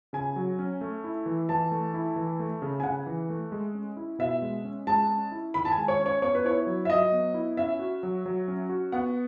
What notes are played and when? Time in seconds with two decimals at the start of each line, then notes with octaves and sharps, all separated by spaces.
0.13 C#3 G#5
0.36 F#3
0.59 C#4
0.81 A3
1.04 E4
1.26 E3
1.49 E3 A5
1.71 A3
1.94 E4
2.16 E3
2.39 A3
2.62 C#3
2.80 G#5
2.83 C#3 F#5
3.06 E3
3.30 A3
3.52 G#3
3.74 C#4
3.97 E4
4.19 B2 E5
4.42 G#3
4.64 C#4
4.87 G#3 A5
5.09 C#4
5.32 E4
5.54 D#3 B5
5.65 A5
5.72 G#5
5.78 G#3
5.88 C#5
5.99 C#4
6.06 C#5
6.22 B3 C#5
6.35 B4
6.45 E4 C#5
6.67 F#3
6.85 E5
6.89 F#3 D#5
7.12 B3
7.34 E4
7.57 C#4 E5
7.79 F#4
8.03 F#3
8.26 F#3
8.48 C#4
8.69 F#4
8.92 B3 F#5